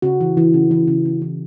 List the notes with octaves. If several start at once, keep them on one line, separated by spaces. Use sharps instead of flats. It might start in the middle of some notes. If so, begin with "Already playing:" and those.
C#3 F#4
E3
E3
C#3
E3
C#3
C#3
E3